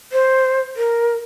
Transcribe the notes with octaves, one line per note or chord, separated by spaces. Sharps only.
C5
A#4